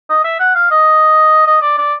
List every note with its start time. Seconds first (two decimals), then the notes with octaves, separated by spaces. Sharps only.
0.10 D#5
0.24 E5
0.39 F#5
0.55 F5
0.71 D#5
1.47 D#5
1.62 D5
1.78 D5